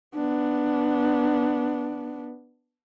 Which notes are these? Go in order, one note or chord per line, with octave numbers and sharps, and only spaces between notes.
B3 D4